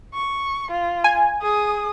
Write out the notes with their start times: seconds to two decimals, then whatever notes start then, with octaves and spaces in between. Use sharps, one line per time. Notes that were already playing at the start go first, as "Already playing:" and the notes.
0.14 C#6
0.71 F4
1.04 G#5
1.42 G#4 D#6